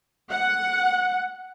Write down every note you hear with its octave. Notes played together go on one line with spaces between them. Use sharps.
F#5